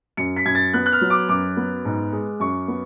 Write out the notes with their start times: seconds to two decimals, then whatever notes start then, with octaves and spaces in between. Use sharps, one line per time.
0.17 F#2 C#7
0.37 B6
0.46 F#2 G#6
0.55 A6
0.73 B3 F#6
0.86 F#6
0.92 F6
1.01 F#3
1.10 D6
1.29 F#2 D6
1.57 B3
1.85 G#2
2.13 G#3
2.40 F#2 C#6
2.68 B3